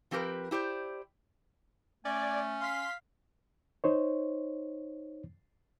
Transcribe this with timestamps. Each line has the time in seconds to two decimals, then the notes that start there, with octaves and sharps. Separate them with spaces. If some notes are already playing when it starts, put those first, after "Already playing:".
0.11 F3 C4 G4 A#4 B4
0.51 E4 G4 C5 D5
2.05 A3 C#4 D5 G#5
2.61 F5 C6 B6
3.84 D#4 C5 C#5